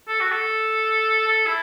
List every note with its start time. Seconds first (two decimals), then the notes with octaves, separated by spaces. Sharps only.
0.08 A4
0.20 F#4
0.32 A4
1.27 A4
1.47 E4